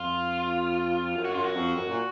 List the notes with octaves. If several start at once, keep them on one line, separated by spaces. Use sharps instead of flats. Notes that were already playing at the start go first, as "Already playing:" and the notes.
Already playing: F2 F4
F#2
F#4
F#2 F4
F#4
F2
F#2
A#2